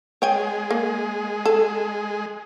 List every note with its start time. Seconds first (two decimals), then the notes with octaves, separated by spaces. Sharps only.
0.22 G#3 C#5 G5 G#5
0.71 A#3
1.46 A4